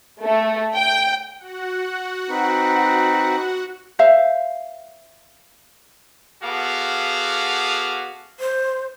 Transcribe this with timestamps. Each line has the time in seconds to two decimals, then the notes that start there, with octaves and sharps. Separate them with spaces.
0.23 A3
0.76 G5
1.38 F#4 F#5
2.29 C4 D#4 B4
3.99 C5 E5 F5
6.43 B3 F#4 G#4 A4 F5 D6
8.40 C5